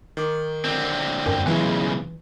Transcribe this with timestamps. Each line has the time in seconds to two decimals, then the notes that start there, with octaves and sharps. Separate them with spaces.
0.17 D#3 D6
0.65 D3 C4
1.26 F#2 G5
1.46 B1 C#3 E3 G#3 E4 F4